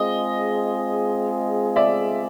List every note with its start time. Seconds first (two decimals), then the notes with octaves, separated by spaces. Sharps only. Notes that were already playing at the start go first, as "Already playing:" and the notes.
Already playing: G#3 C4 F4 G#4 D#5
1.76 D5 E5